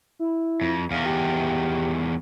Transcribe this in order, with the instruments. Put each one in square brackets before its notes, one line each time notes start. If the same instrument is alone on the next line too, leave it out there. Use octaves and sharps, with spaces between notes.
[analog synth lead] E4
[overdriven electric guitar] F2
[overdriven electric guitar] E2 D#3 [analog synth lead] F5
[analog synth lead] G4